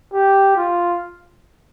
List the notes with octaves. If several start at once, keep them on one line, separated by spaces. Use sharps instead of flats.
G4
F4